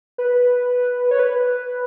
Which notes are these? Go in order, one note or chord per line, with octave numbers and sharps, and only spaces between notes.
B4
C#5
B4